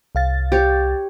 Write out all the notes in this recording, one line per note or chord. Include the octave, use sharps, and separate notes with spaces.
C2 F5 A6
G4 C#5